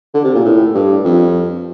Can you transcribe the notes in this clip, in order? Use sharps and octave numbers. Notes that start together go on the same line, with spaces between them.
D3
C3
A#2
A2
G2
F2